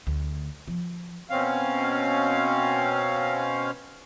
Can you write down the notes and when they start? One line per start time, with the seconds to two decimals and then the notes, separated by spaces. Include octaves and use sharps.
0.07 D2
0.68 F3
1.30 B2 C4 C#4 F5